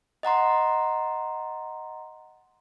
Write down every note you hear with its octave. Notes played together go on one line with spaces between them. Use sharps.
D#5 F#5 A#5 C6